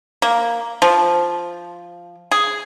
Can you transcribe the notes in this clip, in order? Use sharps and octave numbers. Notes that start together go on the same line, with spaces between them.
A#3
F3
G#4